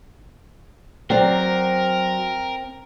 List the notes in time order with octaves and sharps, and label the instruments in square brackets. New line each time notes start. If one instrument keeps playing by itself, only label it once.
[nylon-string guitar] F#3 D5 [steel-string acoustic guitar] C4 [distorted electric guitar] A#4